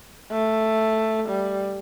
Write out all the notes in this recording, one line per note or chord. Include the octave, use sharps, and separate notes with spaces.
A3
G3